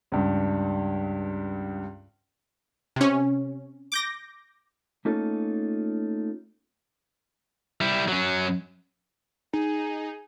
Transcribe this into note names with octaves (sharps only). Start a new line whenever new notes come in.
C#2 G2
C3 C#4
D6 G6 A#6
A3 A#3 C#4 D#4 F4 A4
G3 E4
F#3 C#4
D#4 G#4